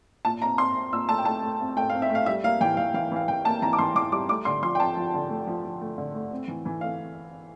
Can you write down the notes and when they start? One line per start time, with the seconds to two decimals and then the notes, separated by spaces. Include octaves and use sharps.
0.25 A#2 A5
0.42 C4 A#5
0.58 C4 C6
0.76 C4
0.93 A#2 E6
1.08 A3 A5
1.18 G5
1.25 A3 A5
1.43 A3
1.60 C4
1.76 A3 G5
1.89 F5
1.94 C4
2.02 E5
2.10 A3
2.15 F5
2.26 G3 E5
2.44 A#3 F5
2.61 E3 G5
2.77 E3 F5
2.94 E3 F5
3.11 E3 F5
3.28 E3 G5
3.45 A#3 A5
3.62 E3 A#5
3.73 D6
3.79 E3 C6
3.95 E3 D6
4.12 G3 D6
4.29 A3 D6
4.45 D3 C6
4.62 F3 C6
4.75 G5
4.80 F3 A5
4.97 F3
5.14 D3
5.30 A3
5.47 F3
5.64 F3
5.81 A3
5.98 D3
6.14 A3
6.31 C4
6.48 E3
6.65 E3
6.81 A3 F5